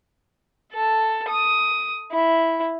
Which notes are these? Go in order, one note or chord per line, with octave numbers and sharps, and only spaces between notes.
A4
D#6
E4